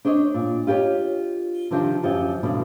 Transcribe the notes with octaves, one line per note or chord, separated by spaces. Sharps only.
D4 C5 C#5 D#5
A#2
F4 G4 A4 C#5 D#5
C3 D#3 F3 C4 D4
F#2 D3 F3 G4
G2 B2 D3 E3 F3